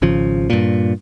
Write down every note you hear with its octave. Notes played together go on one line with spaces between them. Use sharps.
G#1 C#3 F3
G2 A#2